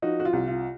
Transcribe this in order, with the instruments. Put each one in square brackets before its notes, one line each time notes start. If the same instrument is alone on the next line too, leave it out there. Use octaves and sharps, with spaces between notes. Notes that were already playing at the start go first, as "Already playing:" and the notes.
[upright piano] F3 D#4 F#4
F#4
F4
C2
F4